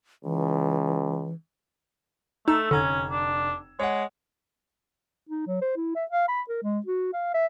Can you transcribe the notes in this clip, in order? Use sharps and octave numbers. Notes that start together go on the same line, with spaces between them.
C#2 E3
A3 D#4 A4 E6
F1 D3 C#4 A#5 G#6
D4
G#3 C#5 F#5
D#4
F#3
C5
E4
E5
F5
B5
A#4
G#3
F#4
F5
E5